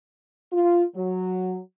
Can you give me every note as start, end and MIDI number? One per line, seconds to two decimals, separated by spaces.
0.53 0.84 65
0.95 1.59 54